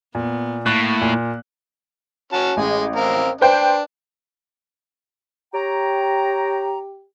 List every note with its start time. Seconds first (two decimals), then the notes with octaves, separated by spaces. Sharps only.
0.15 A#2 B3
0.66 A2 A#3 C#6 F#6
1.01 A#2
2.33 C#4 F#4 A5
2.57 A1 G#3 G#5
2.96 C4 A#4 F5
3.41 D4 B4 C5 G5
5.54 G4 C#5 G5 A#5